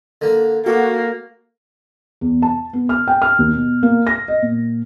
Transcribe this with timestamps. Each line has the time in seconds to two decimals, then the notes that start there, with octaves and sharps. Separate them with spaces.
0.21 D3 A#3
0.66 A#3 F#4 A4
2.21 E2
2.42 A5
2.73 B3
2.89 F6
3.08 G5
3.22 F6
3.39 D#2
3.54 B2
3.83 A#3
4.07 A#6
4.28 D#5
4.42 A#2